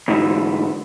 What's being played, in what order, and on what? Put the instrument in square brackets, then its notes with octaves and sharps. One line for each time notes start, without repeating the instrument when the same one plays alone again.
[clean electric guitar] D2 G#2 E3